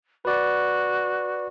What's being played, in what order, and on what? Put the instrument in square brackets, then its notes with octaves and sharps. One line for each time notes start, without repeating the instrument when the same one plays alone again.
[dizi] F#4 [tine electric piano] B4 D5